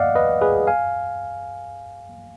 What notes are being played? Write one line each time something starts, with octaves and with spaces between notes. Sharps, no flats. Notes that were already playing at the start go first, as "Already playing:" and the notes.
Already playing: D5 D#5 F5 F#5
B4 D#5
G#4 B4
F5 G#5